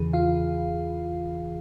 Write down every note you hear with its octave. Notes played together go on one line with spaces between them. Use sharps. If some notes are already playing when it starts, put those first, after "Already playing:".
Already playing: E2 C#3 E3 G#4
F4 F5